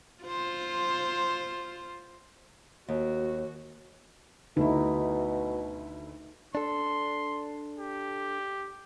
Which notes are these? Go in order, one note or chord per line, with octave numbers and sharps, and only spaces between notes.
F4 C5
D#2 F#4
D2 B2 A3 D#4 E4
D4 A4 C6
G4